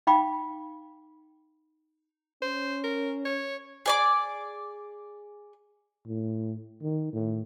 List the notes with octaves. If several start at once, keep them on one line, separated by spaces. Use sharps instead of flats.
D#4 F5 G5 B5 D6
C#4 C5
A#4
C#5
G#4 D5 D6
A2
D#3
A2